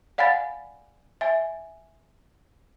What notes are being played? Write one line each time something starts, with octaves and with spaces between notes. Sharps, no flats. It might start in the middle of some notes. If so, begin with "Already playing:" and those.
D5 F5 F#5 G#5 B5 A6
E5 G#5